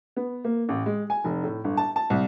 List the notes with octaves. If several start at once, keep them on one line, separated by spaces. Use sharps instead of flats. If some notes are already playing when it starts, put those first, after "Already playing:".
B3
A#3
A1
G#3
G#5
F1
A2
G1
A5
A5
C2